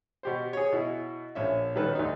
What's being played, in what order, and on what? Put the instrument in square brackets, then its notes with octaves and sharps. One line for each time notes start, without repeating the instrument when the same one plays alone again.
[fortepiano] B2 G4 C5
G#4 C#5
B2 E4
A#1 C#4 E5
B2 D#3 G3 C#4 A4 B4
D2 D#4